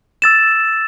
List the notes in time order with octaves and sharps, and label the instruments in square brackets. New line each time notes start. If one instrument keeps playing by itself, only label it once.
[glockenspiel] E6 A6 E7